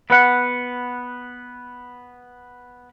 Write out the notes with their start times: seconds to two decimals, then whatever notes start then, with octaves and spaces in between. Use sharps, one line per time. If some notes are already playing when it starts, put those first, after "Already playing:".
0.10 B3 B4 F#5